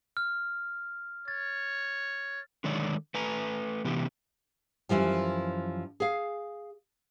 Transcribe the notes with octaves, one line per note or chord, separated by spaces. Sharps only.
F6
C#5 A6
D3 D#3 G#3 D4 C#5 D5
A3 B4 G#5 A#5
C3 E3 B3 G4
F#2 B2 E3 F3 G3
G#4 F5